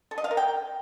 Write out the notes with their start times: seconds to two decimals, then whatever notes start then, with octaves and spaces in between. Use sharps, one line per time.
0.11 A4
0.18 D#5
0.24 F5
0.31 A#4
0.37 G5